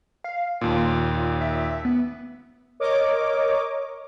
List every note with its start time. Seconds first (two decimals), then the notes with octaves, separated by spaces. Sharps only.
0.24 F5
0.61 D#2 A#2 F4
1.41 E5
1.85 B3
2.80 A#4 C#5 D#5 D6